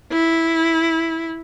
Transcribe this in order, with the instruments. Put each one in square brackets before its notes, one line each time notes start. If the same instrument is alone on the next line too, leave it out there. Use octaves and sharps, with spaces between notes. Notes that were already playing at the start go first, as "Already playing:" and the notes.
[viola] E4